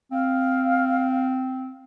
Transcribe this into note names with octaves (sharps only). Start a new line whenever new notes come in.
C4 F5